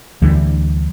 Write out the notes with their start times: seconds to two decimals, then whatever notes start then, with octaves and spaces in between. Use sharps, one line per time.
0.22 D2 D3 E3 G3